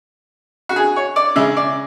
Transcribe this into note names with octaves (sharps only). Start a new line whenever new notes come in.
F#4
G#4
C#5
D5
C#3 G#3 E5
D5